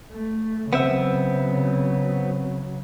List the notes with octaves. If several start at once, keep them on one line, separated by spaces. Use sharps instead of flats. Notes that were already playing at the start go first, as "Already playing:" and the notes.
A3
C#3 F#3 B3 C4 E5